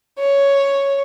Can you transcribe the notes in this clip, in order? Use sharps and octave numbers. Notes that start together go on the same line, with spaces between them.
C#5